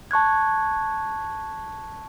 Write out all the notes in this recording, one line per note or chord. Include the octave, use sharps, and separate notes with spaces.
A5 C#6 F#6 G#6